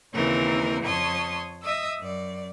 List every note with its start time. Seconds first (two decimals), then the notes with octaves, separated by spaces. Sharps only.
0.14 D#2 C#3 E3 C4 D#4 A#4
0.85 F2 C#5 A5 C6 D#6
1.63 D#5 E5 D#6 E6
2.00 F#2 D5